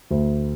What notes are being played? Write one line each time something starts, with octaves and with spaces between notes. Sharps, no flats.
D2